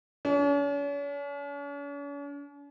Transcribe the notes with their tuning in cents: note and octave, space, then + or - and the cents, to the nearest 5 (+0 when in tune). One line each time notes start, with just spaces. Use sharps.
C#4 +45